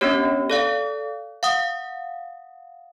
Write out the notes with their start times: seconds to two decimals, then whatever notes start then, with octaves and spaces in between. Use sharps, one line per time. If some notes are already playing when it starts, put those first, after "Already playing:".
0.01 B3 C#4 D4 G4 C#5
0.50 A4 D5 F5
1.43 F5 F#5 D#6